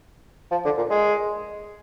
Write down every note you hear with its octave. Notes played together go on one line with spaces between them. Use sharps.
F3
D3
A#2
G#3